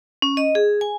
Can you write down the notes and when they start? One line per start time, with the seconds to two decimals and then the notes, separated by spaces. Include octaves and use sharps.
0.22 C#4
0.37 D#5
0.55 G#4
0.81 G#5